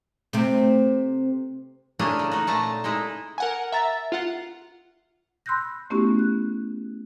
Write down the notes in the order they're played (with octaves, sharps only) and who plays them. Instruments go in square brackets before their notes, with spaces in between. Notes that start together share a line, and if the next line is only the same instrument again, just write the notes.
[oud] C3 A3 C4
[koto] E3 A3 A#3 C#4 D4 G#4
C#3
D#4 F#4
A#2 A3 A5 A#5
G#3 D#4 E4
[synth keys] A#4 F#5 G#5
E5 A#5 A6
F4 F#5
[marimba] B5 C6 E6 F#6 G6 A#6
A3 B3 C#4 E4 F#4 G4
F#6